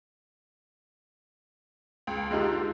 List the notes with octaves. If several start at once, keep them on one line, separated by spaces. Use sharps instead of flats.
C#2 G5
D3 G#3 D#4 F4 G4